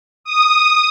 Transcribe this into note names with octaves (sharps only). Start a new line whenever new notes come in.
D#6